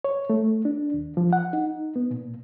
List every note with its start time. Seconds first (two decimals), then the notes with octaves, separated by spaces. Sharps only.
0.04 C#5
0.30 A3
0.65 D4
0.94 D#2
1.17 F3
1.33 F#5
1.53 D#4
1.96 B3
2.11 A#2